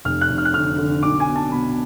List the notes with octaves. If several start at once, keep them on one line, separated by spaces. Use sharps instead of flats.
F1 F6
F#6
F1
F6
F#6
D3 F6
D3
B1 D6
G#5
B2
A5
B2 B5